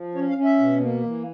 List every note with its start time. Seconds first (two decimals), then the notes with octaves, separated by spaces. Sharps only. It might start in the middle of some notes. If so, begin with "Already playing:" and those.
Already playing: F3
0.15 C#4 C#5
0.29 F5
0.36 C#4
0.44 E5
0.59 B2
0.80 A#3
1.03 E3